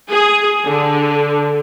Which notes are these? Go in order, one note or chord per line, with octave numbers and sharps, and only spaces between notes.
G#4
D3